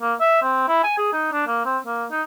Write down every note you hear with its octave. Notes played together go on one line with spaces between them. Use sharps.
A#3
E5
C4
E4
G#5
G#4
D#4
D4
A#3
C4
A#3
D#4